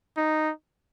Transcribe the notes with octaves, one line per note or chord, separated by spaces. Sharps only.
D#4